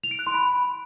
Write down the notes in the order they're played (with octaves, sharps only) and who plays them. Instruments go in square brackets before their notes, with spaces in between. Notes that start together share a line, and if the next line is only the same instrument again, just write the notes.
[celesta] F7
D7
F#6
C6
B5